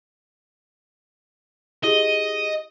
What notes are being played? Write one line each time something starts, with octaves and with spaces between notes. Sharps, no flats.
E4 G4 G#4 D#5